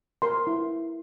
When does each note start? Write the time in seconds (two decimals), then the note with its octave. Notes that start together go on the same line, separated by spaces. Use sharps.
0.22 A#4 C6
0.47 E4